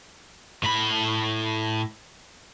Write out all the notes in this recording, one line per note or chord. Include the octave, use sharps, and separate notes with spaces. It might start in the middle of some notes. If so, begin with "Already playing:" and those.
A2 B5